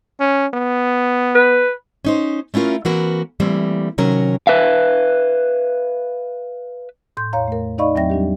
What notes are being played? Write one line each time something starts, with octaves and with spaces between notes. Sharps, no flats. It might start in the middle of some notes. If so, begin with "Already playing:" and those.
C#4
B3
B4
C#4 D#4 C5
A3 C#4 E4 F4 A#4
E3 A#3 C4 F#4 A#4 B4
E3 G3 A3 A#3 C4
C3 D#3 F#3 C#4 A#4
B4 E5 F5
A2 C6 G6
E2 A2 C#5 F5 A#5
A3 A#4
D#4 D5 D#5 F5 B5 C#6
E2 F#3 C4 E5 G5 A#6
G3 D4 G4